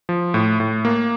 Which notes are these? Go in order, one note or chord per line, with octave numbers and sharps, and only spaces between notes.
F3
A2
A2
A#3